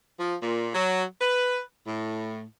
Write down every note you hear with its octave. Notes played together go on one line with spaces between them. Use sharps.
F3
A#2
F#3
B4
A2